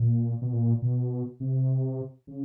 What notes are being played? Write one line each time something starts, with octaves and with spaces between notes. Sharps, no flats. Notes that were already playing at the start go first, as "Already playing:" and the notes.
Already playing: A#2
B2
A#2
B2
C3
C#3